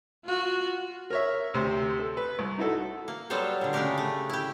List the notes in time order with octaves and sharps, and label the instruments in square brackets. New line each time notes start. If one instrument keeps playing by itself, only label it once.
[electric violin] F4 F#4
[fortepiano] A#4 C#5 E5
D2 C3 C5
A4
B4
C2
D#4 E4 F#4 A4
[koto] A#3
F#3 G3 B3 A4 C5 C#5
A#2 D3
C#3 G#3 A3 D4 G4 A#4
A3
E4 G4